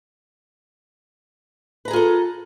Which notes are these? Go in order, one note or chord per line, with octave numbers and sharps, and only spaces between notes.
F4 G#4 A4 B4 A#5